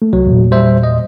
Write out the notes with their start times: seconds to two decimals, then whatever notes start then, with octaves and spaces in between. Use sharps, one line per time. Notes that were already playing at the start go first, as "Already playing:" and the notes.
0.02 A3
0.13 C2 F#3
0.27 E2 A#2
0.51 G3 C5 E5
0.83 D#5